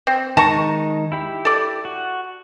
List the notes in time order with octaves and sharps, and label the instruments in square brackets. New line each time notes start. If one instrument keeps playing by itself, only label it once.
[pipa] C4
[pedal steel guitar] D#3 G#3 D#4 [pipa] A5 A#5 C#6
[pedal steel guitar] E4 G4 B5
[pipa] A4 D5
[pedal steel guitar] F#4